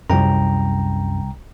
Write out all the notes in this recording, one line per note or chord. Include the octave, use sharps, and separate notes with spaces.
C2 F#2 G5 A#5